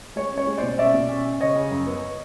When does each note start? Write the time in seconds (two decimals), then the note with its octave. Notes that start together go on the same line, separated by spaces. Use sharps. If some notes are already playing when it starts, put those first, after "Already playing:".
0.16 G#3 C#5
0.32 C#4
0.38 C#5
0.47 G#3
0.58 B2 C5 D5
0.78 C#4 D5 E5
0.94 B2
1.09 C#4
1.25 C#4
1.41 C#3 C#5 D#5
1.56 C#3
1.71 F#2
1.87 B3